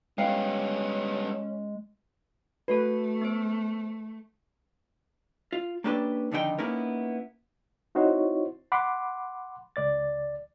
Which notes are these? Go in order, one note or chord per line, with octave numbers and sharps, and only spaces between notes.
G3 G#3 B3 C#4 F5 G5
A3 F#4 A4 B4
B3 C5
F4
A#3 C#4 D4 G4 A4 B4
F2 D3 D#3 D#4 A4 G5
A#3 B3 C#4 D#4 E4 A#4
C4 D#4 E4 F#4 C5 C#5
F#5 B5 C6 D6
C#2 D5 A6